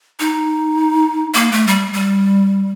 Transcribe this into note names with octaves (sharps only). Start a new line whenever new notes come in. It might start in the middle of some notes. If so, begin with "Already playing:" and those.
D#4
A#3
A3
G3
G3